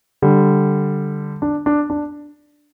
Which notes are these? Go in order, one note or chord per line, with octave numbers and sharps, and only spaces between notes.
D3 G3
D4
D4
D4